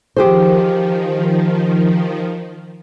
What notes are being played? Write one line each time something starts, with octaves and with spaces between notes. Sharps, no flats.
D#3 F3 G4 G#4 C5